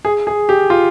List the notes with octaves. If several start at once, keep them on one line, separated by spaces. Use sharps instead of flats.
G#4
G#4
G4
F4